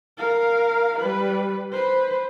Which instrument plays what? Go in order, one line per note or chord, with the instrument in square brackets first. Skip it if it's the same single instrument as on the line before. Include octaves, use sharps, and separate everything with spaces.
[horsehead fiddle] A#4 F5
G3 B4
B4 C5